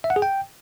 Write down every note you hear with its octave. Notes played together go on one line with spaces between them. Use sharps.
E5
F#5
G#4
G5